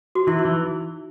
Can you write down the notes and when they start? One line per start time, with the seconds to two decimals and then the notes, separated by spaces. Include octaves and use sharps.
0.15 F#4
0.27 E3 E4
0.39 D#4
0.45 E3